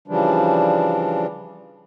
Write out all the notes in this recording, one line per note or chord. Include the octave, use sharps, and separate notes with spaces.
C#3 E3 F3 G3 D4